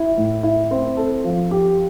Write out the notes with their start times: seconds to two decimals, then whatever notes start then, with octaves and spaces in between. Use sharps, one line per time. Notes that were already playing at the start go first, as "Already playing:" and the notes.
Already playing: E4
0.17 A2
0.43 E4
0.71 C4
0.97 A4
1.24 F3
1.51 G4